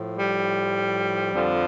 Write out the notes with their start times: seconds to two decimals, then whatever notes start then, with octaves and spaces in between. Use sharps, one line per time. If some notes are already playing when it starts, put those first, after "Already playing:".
Already playing: A2 F3
0.17 G3
1.33 F2 D3 F3